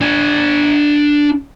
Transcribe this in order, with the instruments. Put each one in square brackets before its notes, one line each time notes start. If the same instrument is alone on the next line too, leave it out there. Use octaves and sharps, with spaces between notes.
[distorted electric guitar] D4 G#5